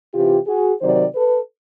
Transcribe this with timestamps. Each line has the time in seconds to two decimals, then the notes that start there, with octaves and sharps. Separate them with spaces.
0.14 C3 E3 F4 G4
0.47 F#4 G#4
0.81 C3 D#3 F#3 C5 D5
1.15 A4 B4